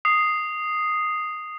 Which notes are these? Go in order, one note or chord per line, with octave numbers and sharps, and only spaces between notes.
D#6 C7